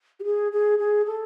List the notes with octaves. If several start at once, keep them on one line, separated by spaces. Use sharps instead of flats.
G4
G#4
G#4
G#4
A4